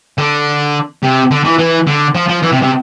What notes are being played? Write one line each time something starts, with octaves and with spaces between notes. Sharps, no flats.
D3
C3
D3
E3
E3
D3
F3
F3
E3
C3
C3